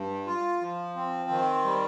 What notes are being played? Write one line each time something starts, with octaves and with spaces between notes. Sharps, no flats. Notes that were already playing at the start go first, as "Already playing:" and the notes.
Already playing: G2
F4
F3
C4
D#3
G3